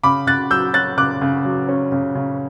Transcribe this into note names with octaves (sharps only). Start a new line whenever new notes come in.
C#3 B5 D6
C#3 F#6 A6
F#3 E6 G6
C#4 F#6 A6
C#3 D6 F#6
C#3
F#3
C#4
C#3
C#3